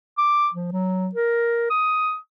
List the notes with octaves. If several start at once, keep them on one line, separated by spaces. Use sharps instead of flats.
D6
F3
F#3
A#4
D#6